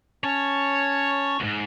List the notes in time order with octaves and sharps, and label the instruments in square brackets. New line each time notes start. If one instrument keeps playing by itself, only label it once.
[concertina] C#4 A5 [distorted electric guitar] C#5
[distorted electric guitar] D2 G#2